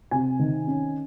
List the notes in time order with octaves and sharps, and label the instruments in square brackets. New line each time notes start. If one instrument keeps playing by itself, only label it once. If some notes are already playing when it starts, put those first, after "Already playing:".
[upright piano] C3 G#5
D#3
C#4